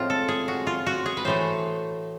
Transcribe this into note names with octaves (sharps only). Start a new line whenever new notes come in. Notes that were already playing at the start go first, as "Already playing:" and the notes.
Already playing: A2 F3 G#3 C4 F4
A4
G#4
F#4
F4
F#4
G#4
B4
A2 E3 A3 C5